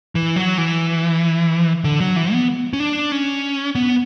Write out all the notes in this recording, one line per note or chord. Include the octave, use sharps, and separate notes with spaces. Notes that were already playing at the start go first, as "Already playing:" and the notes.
E3
F#3
E3
D3
F#3
E3
B3
C#4
D4
C#4
B3